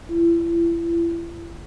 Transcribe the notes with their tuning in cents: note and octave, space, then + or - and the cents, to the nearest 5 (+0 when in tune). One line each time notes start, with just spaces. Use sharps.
E4 +35